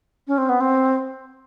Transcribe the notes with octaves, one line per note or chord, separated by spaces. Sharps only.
C#4
C4
B3
C4